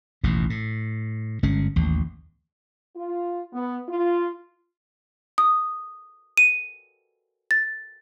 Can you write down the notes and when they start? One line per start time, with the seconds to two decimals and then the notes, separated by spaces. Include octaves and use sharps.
0.24 A1 D#2 B2
0.50 A2
1.43 G1 G#3 C#4
1.76 A1 D#2
2.96 F4
3.53 B3
3.88 F4
5.38 D#6
6.37 D#7
7.51 A6